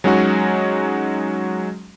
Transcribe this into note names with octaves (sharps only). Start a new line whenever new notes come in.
F#3 G#3 C#4 D#4 F#4